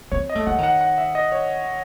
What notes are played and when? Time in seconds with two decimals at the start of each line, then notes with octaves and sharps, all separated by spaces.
0.12 C4 C#5
0.29 D#5
0.35 A3
0.47 E3 F#5
0.58 D#3 F#5
0.81 F#5
0.98 E5
1.15 D#5
1.32 C#5